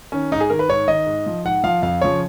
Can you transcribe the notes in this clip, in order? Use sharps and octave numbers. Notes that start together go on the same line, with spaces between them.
D#3 C#4
G#2 D#4
G#4
D#3 A#4
B4
G#2 C#5
D#3 D#5
G#2
F3
G#2 F#5
F3 F5
F2 F5
C#3 F3 C#5